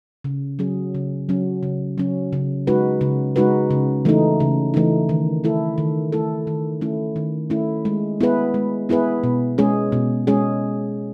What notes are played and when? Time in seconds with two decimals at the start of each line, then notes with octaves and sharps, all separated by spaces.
0.24 C#3
0.59 F#3 C#4 G#4
0.94 C#3
1.29 F#3 C#4
1.63 C#3
1.98 F#3 C#4
2.33 C#3
2.67 G#3 D#4 F#4 B4
3.01 C#3
3.36 G#3 D#4 F#4 B4
3.71 C#3
4.05 E3 A3 D#4
4.40 C#3
4.74 E3 A3 D#4
5.09 D#3
5.44 A3 E4 A4
5.78 D#3
6.12 A3 E4 A4
6.47 D#3
6.81 A3 C#4 E4
7.16 D#3
7.50 A3 C#4 E4
7.85 G#3
8.20 B3 E4 G#4 B4
8.54 G#3
8.89 B3 E4 G#4 B4
9.23 B2
9.58 G#3 C#4 G#4
9.92 B2
10.27 G#3 C#4 G#4